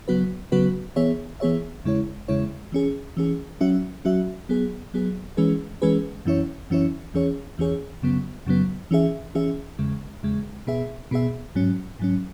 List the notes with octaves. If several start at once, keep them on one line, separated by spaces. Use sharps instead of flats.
C#3 F#3 B3 F#4 B4
C#3 F#3 B3 F#4 B4
E3 B3 G#4 C#5 E5
E3 B3 G#4 C#5 E5
E2 C#3 G#3 E4 C#5
E2 C#3 G#3 E4 C#5
E3 C#4 G#4
E3 C#4 G#4
F#3 C#4 F#4 E5
F#3 C#4 F#4 E5
F#3 B3 G#4
F#3 B3 G#4
E3 G#3 C#4 G#4 B4
E3 G#3 C#4 G#4 B4
F#2 E3 C#4 E4 C#5
F#2 E3 C#4 E4 C#5
E2 E3 C#4 G#4 C#5
E2 E3 C#4 G#4 C#5
F#2 C#3 F#3 B3
F#2 C#3 F#3 B3
E3 C#4 G#4 E5
E3 C#4 G#4 E5
E2 C#3 G#3
E2 C#3 G#3
B2 B3 G#4 E5
B2 B3 G#4 E5
G#2 F#3 C#4
G#2 F#3 C#4